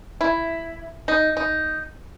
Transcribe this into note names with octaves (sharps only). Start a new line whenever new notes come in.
E4
D#4
D#4